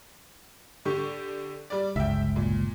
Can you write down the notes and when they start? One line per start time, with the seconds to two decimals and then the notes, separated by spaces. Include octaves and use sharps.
0.85 D3 G4 C#6
1.70 G3 D5
1.96 G1 C#2 E5 G5
2.36 A#2